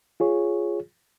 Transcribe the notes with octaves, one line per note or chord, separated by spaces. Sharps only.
F4 G#4 C#5